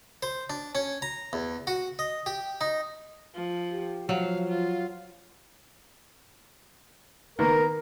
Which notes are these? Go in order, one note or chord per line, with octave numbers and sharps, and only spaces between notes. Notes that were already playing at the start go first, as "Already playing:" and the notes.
C5
D4
C#4
A#5
E2
F#4
D#5
G4
D#4
F3
G4
F3 F#3 F5
F4
D#3 A#3 B3 A#4